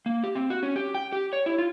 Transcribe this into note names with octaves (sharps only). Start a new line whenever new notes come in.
A#3
G4
C4
F#4
C#4
G4
G5
G4
C#5
E4
F4